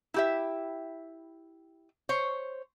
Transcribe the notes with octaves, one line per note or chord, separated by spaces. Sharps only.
E4 G4 E5
C5 C#5